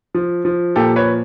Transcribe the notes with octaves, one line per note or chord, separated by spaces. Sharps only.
F3
F3
A#2 G4 A4
B4 C#5